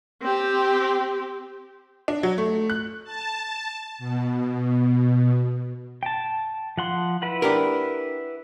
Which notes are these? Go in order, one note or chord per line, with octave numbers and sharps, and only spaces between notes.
C4 G4
D4
F#3
A3
F#6
A5
B2
G5 A5
F3 F#5 C6
E4 B4 F#5
D4 G4 A#4